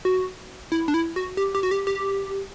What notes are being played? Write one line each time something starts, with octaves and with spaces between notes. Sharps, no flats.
F#4
E4
D4
E4
F#4
G4
G4
F#4
G4
G4